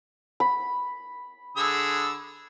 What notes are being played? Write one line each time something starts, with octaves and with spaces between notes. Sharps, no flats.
B5
D3 G#4 E6